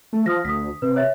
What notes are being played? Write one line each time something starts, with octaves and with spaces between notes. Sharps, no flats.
A3
F3 D#6 F6 A#6
D2 D#6 B6
C3 B4
C#5 E5 A6